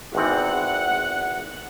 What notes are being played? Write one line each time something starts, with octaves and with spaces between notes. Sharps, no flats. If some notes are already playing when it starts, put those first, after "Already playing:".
G#1 E2 C4 F#5